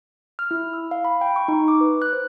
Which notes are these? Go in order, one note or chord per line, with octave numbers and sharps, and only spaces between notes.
F6
E4
E6
F5
B5
G5
C#6
D#4
D6
B4
F#6
C5